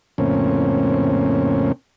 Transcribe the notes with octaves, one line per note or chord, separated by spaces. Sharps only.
F2 A2 C#3 A#3 C4 C#4